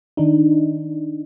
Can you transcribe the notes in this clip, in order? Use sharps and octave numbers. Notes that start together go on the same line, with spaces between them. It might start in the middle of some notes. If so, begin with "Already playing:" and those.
D#3 D4 D#4